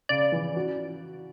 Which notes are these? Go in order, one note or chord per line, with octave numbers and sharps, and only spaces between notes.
C#3 D5
E3
F#4